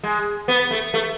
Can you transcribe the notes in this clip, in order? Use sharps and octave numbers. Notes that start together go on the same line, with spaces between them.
G#3
B3
A3
A3